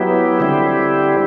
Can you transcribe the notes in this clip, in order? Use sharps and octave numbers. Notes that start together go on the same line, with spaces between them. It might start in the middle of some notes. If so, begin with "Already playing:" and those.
Already playing: F#3 B3 E4 G4
D3 G3 C4 E4 G4